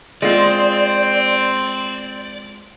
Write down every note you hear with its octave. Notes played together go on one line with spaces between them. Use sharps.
G#3 C4 F4 D5